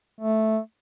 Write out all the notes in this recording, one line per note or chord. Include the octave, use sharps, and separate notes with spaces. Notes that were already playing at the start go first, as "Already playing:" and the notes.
A3